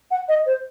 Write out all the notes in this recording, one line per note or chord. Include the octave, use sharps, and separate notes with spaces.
F#5
D#5
C5